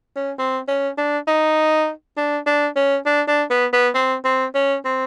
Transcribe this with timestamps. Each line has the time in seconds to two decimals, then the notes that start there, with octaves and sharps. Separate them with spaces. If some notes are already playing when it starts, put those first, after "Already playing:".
0.17 C#4
0.39 C4
0.68 C#4
0.98 D4
1.28 D#4
2.17 D4
2.46 D4
2.76 C#4
3.06 D4
3.28 D4
3.50 B3
3.73 B3
3.95 C4
4.25 C4
4.55 C#4
4.85 C4